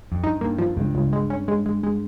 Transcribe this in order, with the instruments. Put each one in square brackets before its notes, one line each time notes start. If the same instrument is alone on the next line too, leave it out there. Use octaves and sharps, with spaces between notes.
[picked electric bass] F2
[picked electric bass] G2 [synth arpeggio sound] D#4
[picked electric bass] G2 [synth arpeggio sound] A#3
[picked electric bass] G2 [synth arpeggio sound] F3
[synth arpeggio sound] C#2 [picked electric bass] G2
[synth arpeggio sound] C#2
G#3
C#4
G#3
G#3
G#3